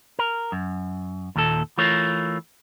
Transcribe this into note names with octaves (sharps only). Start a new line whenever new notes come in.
A#4
F#2
D#2 A#2 A4
E3 A3 F4 A#4 C#5